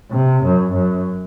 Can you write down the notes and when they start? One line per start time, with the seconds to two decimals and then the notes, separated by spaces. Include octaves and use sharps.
0.11 C3
0.43 F#2
0.74 F#2